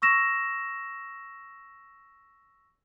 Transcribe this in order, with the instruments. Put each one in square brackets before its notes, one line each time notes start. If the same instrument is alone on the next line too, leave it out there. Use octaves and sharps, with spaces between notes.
[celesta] C#6 E6 A#6 E7